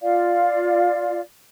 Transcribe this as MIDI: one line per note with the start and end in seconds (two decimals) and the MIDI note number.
0.01 1.20 65
0.01 1.20 74
0.01 1.20 77